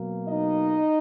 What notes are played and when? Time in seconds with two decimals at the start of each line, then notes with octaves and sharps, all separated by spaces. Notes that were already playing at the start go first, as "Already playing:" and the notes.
Already playing: B2 F#3 A#3
0.27 D#4 D#5